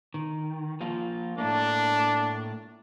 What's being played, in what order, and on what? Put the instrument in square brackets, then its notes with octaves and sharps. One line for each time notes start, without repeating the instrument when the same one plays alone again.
[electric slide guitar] D#3
F3 A#3 F4
[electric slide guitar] A2 A3 A#3 [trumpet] D4